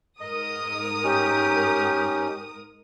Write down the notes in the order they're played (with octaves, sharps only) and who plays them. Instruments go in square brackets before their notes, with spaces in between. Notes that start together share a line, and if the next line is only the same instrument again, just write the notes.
[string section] G#2 A#4 D#6 [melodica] D#5
[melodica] C#4 D#4 [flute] G4